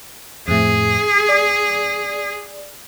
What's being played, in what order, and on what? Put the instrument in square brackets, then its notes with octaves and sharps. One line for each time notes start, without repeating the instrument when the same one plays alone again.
[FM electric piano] F2 A2 [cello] G#4
[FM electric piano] D5